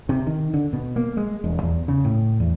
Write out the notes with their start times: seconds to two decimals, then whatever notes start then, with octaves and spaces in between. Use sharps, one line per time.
0.09 C3
0.27 D#3
0.54 D3
0.73 B2
0.96 A#3
1.17 G#3
1.44 E1
1.63 E2
1.88 C#3
2.05 A2
2.40 E2